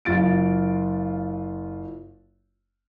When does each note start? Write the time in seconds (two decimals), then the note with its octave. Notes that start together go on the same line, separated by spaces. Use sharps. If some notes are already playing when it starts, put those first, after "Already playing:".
0.05 F#1 F4 A6 D7